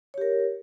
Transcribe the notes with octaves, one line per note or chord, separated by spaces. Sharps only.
G4 A#4 C#5